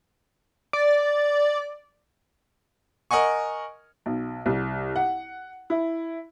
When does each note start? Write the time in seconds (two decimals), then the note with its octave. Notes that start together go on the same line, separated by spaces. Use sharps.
0.73 D5
3.11 A#4 D#5 F#5 G#5 C#6
4.06 B1
4.46 C2
4.96 F#5
5.70 E4